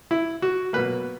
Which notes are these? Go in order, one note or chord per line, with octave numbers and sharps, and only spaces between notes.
E4
F#4
B2 F#3 A#3 B4